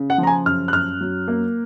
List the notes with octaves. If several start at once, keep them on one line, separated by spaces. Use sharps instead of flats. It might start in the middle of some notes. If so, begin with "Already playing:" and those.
Already playing: C#3
F#5
F3
A#5
G#5
F#2 F6
F#6
F#2 F6
F#3
A#3